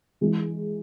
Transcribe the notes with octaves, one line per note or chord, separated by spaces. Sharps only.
E3 G#3